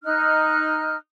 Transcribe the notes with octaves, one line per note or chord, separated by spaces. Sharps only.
D#4 F6 F#6